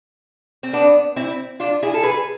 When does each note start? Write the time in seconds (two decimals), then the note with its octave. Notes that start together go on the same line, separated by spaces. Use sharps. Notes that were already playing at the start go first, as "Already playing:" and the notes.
0.63 C4
0.73 B3 D4
1.16 C4 E4
1.60 D4 F4
1.83 E4 G#4
1.94 A4
2.03 G#4 B4